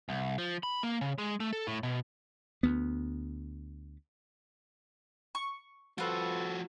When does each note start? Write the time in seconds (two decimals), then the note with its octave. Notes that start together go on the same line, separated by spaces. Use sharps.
0.09 C2
0.38 F3
0.63 B5
0.83 A#3
1.01 C#3
1.18 G#3
1.40 A3
1.53 A4
1.67 A2
1.83 B2
2.63 D2 B3
5.35 C#6
5.98 F3 C4 F4 F#4 A4 B4